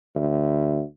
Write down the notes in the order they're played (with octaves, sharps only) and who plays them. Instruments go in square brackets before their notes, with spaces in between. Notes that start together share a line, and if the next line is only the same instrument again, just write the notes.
[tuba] D2